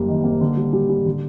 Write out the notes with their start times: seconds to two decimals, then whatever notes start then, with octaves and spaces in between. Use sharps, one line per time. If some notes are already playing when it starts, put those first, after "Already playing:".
Already playing: F#1 G3 A#3
0.08 D#3
0.24 A#3
0.41 D3
0.57 G3
0.73 G3
0.89 G3
1.06 D3